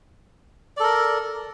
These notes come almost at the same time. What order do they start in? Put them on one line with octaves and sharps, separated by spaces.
D5 A4 A#4